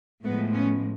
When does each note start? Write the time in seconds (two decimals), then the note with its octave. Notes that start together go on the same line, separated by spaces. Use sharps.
0.24 A2 F3 G#3 A3 B3
0.52 B3 C#4